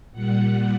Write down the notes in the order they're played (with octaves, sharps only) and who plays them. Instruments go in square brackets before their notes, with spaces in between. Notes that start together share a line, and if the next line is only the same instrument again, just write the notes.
[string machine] A#2 G3 F#5